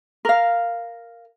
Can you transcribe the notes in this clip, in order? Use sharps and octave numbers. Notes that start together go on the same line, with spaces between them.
A#4 F5